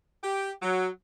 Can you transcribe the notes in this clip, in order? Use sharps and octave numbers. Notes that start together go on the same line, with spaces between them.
G4
F#3